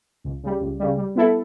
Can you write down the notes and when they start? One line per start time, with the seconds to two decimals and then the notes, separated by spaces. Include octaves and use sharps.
0.24 C#2
0.43 C#3 G3
0.61 C#2
0.80 C#3 G3
0.98 G3
1.16 B3 E4 A4